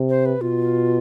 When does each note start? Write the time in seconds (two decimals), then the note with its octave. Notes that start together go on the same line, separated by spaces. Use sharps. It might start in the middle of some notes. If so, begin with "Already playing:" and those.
Already playing: C3
0.10 C5
0.26 B4
0.41 B2 F4